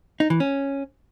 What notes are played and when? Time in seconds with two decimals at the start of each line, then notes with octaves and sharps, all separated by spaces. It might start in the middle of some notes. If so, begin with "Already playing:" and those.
0.20 D#4
0.30 E3
0.40 C#4